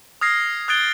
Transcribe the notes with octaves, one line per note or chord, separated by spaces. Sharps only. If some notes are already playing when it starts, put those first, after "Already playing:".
D#6 F6 G#6 A#6 C7
D#6 F#6 G#6 A6 D7 G7